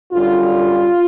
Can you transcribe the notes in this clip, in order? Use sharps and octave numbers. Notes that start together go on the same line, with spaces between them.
F#2 D3 G3 F4